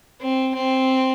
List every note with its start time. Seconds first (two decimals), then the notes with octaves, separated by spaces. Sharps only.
0.21 C4
0.56 C4